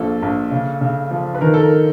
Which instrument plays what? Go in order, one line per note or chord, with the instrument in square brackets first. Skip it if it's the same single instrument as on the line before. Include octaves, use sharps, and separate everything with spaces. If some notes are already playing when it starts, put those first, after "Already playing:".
Already playing: [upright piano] A#1 F3 A4
A#1
C#3
C#3
F3
B4
D#3 A#4
A4
A#4